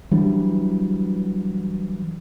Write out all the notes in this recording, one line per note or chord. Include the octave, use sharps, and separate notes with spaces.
E3 F#3 G3 D4